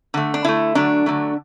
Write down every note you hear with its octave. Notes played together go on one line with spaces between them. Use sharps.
D3 A3
D4
D3 A3 E4
D3 F#3 A3 D4
D3 F#3 A3